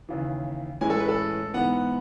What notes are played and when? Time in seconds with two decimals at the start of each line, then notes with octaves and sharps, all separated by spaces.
0.09 D#2 C#3 E3
0.81 A2 E3 G#3 C#4 G#5
0.90 A4
1.00 B4
1.08 A4
1.54 G#2 E3 B3 F#5